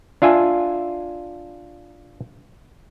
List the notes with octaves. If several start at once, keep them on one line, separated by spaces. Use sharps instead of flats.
D4 F4 E5 G#5